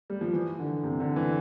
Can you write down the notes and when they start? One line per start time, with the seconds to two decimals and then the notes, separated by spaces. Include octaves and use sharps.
0.10 G3
0.21 F3
0.33 E3
0.59 D3
0.83 C3
1.00 D3
1.16 E3